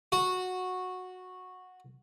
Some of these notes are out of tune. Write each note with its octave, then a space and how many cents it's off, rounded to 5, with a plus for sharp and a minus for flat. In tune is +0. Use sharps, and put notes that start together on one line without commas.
F#4 -10